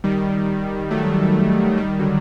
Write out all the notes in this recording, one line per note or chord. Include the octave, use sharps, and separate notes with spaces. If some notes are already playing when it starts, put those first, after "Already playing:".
D#3 G3
F#3 A3
D#3 G3
D3 F#3